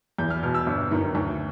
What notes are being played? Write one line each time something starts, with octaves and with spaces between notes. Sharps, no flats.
E2 G6
F6
B2 F6
E6
G1
F#2 D#3
D2